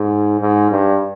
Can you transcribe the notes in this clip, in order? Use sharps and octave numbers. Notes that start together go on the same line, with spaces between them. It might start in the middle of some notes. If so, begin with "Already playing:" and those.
Already playing: G#2
G#2
G2